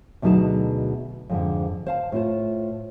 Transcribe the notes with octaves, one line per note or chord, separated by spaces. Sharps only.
D2 B2 F#3 D#4 G#4 A5
F2 G#2 D3
C5 F5 A5
A2 F4 C5